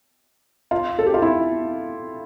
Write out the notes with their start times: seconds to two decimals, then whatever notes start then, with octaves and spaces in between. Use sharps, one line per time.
0.71 F4
0.99 A4
1.06 G4
1.14 F4
1.22 E4